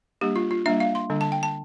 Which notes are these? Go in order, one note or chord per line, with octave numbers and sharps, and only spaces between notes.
G3 A#3 D4 G4
F4
F4
G3 A#3 D4 E5
F5
C6
D3 G3 D4
A5
G5
A5